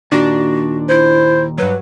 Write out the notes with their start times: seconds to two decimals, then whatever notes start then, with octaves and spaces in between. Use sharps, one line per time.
0.12 D#2 A#2 D4 F#4
0.89 E4 C5
1.58 G2 F#3 B4